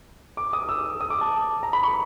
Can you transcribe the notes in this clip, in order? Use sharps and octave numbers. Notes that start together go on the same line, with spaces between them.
D6
D#6
E6
D#6
D6
A5
A#5
B5
C#6